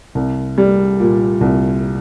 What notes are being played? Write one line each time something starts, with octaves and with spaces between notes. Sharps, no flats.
C2
G3
A#2
C2